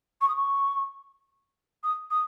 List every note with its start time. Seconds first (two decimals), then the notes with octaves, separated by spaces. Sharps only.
0.21 C#6
0.28 D#6
0.36 C#6
1.83 D#6
2.10 D#6